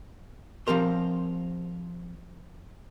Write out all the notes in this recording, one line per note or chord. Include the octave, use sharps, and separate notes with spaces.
F3 C4 G4 A#4 C6